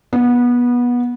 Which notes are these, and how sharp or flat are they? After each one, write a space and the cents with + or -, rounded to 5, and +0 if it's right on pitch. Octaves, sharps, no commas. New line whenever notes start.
B3 -20